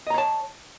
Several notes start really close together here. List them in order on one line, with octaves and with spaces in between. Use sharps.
D#5 A#5 C#5 A5